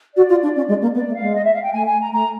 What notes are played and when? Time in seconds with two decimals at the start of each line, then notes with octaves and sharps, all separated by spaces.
0.16 F#4 D5
0.29 F4
0.43 D4
0.56 C#4
0.68 G#3
0.81 A#3
0.94 B3 D5
1.08 A3
1.15 F5
1.21 G#3
1.34 D#5
1.44 E5
1.53 F5
1.63 G5
1.72 A3 G#5
1.85 G#5
2.00 A#5
2.12 A3 A#5